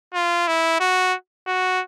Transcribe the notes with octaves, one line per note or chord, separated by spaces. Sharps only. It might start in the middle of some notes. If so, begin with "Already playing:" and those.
F4
E4
F#4
F#4